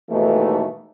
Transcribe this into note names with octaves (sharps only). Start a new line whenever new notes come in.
D#2 G#2 B2 E3 A3